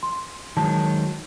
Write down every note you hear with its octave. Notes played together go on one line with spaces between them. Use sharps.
C6
D#3 F#3 G#3 A5